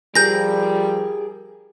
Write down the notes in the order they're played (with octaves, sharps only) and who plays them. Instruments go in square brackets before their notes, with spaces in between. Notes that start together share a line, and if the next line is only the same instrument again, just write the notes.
[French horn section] F3 G3 [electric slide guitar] G4 G#4 A#4 [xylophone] G6 A#6